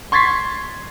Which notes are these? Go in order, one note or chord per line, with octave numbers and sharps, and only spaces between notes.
C6 C#6 G#6 A6 B6 C7